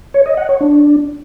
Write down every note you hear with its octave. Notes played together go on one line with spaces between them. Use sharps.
C#5
D#5
F#5
C#5
D4